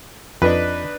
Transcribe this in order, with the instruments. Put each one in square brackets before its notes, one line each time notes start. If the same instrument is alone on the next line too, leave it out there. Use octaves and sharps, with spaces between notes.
[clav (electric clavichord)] F2 [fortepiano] D4 D#4 B4